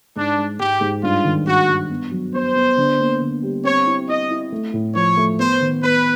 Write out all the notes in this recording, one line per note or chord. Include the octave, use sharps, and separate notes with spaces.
G#2 D4
G#3
G#2 G4
G#2
G2 F4
D#3
G2 F#4
G2
B3
F#3
B3 C5
B3
D3
A#3
D3
G3
C4 C#5
E4
E4 D#5
E4
A3
A2
F3 C#5
A3
B3 C5
D#3
B3 B4